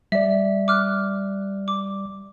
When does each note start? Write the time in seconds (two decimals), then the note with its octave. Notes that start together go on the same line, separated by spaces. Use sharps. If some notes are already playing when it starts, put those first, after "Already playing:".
0.12 G3 D5 E5
0.68 D6 F6 F#6
1.68 D6